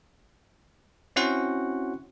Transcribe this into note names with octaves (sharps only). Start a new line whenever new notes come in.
C4 C#4 E4 F#4 C5 F#5